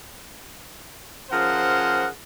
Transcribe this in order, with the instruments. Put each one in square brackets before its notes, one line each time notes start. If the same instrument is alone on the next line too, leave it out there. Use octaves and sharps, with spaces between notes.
[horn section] F3 C#4 G#4 A#4 C5 F#5